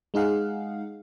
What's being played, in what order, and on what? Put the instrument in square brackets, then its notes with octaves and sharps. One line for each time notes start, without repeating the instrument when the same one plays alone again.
[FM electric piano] G#3 D#4 G#4 F5 F#5